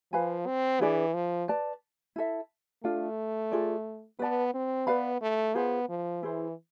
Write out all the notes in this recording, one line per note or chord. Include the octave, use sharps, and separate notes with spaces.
F3 B4 F5 G#5 B5
C4
E3 D4 G#4 B4 D5
F3
B4 D5 A5
E4 A4 E5
A3 D4 F4 A4
F4 G#4 D5
B3 B4 D5 A5
C4
B3 B4 D5 F5 B5
A3
B3 F4 G#4 C5 F5
F3
E3 E4 G#4 C5